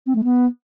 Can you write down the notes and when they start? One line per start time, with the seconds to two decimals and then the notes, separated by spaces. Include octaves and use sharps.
0.07 C4
0.15 A3
0.24 B3